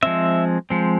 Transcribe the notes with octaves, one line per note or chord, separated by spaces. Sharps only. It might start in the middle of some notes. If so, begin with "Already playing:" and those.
F3 G#3 C4 E5
F3 G#3 C4